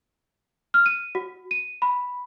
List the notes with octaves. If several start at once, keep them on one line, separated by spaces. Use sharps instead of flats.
F6
D#7
F#4
D#7
B5